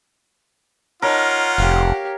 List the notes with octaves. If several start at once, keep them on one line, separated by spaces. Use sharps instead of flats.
D#4 F4 A#4 C#5 F#5
F1 G4 F5